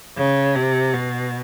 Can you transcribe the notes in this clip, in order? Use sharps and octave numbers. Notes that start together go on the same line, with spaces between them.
C#3
C3
B2